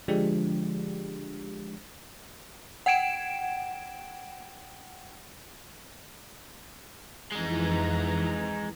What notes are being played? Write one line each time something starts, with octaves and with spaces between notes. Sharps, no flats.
D3 F3 G#3 D4 G4
F#5 G5 G#6 D7 E7
F2 E3 G#3 D#4 A#5